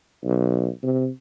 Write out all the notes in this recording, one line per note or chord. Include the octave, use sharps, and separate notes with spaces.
B1
C3